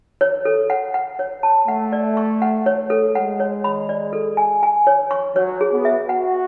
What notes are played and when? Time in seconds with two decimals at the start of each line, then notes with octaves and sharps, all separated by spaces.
0.21 C#5
0.45 A4
0.70 F#5
0.94 F#5
1.19 C#5
1.43 A5
1.68 A3 F#5
1.92 D5
2.17 C#6
2.42 F#5
2.66 C#5
2.90 A4
3.15 G#3 F#5
3.40 C#5
3.64 B5
3.89 D5
4.13 A4
4.37 G#5
4.63 G#5
4.87 C#5
5.11 C#6
5.36 F#3 C#5
5.61 G#4
5.72 B3
5.85 E5
6.09 F#4 F#5